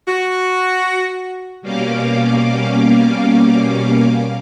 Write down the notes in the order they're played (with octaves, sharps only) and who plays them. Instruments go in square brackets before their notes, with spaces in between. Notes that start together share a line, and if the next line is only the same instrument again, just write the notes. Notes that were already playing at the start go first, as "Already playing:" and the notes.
[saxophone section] F#4
[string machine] B2 G3 A#3 C#4 F5 D6